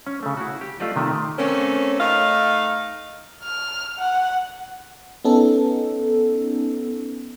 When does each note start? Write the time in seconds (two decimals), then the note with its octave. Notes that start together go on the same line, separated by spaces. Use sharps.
0.07 C#4
0.23 C#3 A3
0.37 E4 F#4
0.61 G4
0.80 A3 F4 G4 D5 D#5
0.96 C3 D#3 A3 E5
1.38 A3 A#3 C4 C#4
2.00 A3 D#4 F5
3.44 F6
3.99 F#5
5.24 B3 C#4 D#4 A4